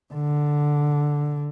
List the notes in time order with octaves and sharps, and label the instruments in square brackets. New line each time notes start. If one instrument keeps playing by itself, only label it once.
[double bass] D3